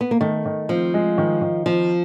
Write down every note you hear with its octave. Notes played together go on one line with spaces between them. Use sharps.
B3
A#3
D#3 A3
D#3
F3 C4
G#3
D#3
D#3
F3 C4